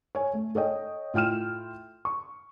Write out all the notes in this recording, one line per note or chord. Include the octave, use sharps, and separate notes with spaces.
C#5 G#5
A3
A4 C#5 D#5 G5
A2 F4 G5 F6 E7
C#6